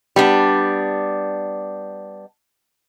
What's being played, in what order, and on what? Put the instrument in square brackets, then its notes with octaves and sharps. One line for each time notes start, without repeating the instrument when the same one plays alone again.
[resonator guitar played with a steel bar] G3 B3 D4